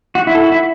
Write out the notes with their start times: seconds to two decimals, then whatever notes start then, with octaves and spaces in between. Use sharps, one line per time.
0.15 F#4
0.27 E4
0.35 A4
0.43 F#4
0.52 E4